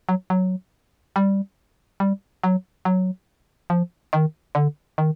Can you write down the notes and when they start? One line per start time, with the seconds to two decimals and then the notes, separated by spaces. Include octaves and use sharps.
0.09 F#3
0.30 F#3
1.16 G3
2.00 G3
2.44 F#3
2.85 F#3
3.70 F3
4.13 D#3
4.55 D3
4.98 D#3